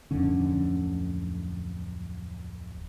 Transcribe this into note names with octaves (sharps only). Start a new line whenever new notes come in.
D1 F2 D3 C#4